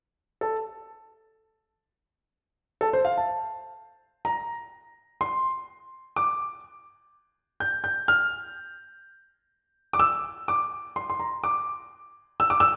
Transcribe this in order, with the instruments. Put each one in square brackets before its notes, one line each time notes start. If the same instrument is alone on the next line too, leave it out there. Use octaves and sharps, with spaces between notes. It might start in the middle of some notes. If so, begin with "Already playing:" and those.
[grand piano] A4
A4
C5
F5
A5
A#5
C6
D6
G6
G6
F6
D6
E6
D6
C6
C6
A#5
D6
E6
D6
E6